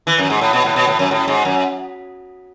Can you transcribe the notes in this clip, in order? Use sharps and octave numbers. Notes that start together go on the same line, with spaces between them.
E3
F#2
G#2
A2
B2
A2
B2
A2
F#2
A2
G#2
F#2